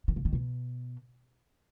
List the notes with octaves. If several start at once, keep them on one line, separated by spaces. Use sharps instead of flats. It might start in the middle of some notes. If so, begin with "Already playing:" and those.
D#3
C#3
D#3
B2